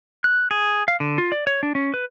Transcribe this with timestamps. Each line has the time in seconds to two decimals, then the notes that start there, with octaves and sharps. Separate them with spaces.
0.24 F#6
0.51 G#4
0.88 F5
1.00 D3
1.18 F4
1.32 D5
1.47 C#5
1.63 D4
1.75 C#4
1.94 B4